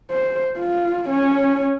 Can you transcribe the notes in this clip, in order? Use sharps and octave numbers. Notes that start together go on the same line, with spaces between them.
C5
F4
C#4 C#5